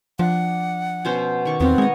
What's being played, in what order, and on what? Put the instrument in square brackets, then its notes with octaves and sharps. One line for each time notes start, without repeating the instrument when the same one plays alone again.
[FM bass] F3 [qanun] D4 [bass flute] F#5
[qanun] B2 C#4 C5
D#3 C#6 D6
[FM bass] E2 [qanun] B3 F#4 F5 [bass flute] C4
[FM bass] G#3 [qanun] C#5 D#5